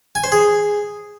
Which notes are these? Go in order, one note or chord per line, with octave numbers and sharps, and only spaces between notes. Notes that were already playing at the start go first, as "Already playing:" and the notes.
G#5
C5
G#4